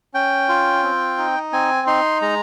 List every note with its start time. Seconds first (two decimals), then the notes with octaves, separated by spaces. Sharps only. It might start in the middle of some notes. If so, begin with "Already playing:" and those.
0.14 C#4 G5
0.49 F4
0.83 C4
1.18 D#4
1.53 C4 G#5
1.87 D#4 C6
2.22 G#3 A#5